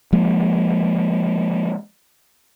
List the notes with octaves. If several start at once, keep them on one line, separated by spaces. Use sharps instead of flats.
F3 G#3 A#3